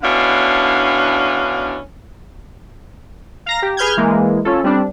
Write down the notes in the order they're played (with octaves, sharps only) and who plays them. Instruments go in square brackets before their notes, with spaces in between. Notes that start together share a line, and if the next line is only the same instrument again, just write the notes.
[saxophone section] B2 D3 C#4 D4 E4 F5
[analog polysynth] F5 A#5 A#6
G4
G#4 B4 F6 G6 G#6
E3 G#3 A#3
C#4 F4 A4
G3 C4 D4